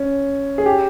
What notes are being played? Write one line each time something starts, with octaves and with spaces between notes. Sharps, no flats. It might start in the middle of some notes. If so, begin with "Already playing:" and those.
Already playing: C#4
G#4
G4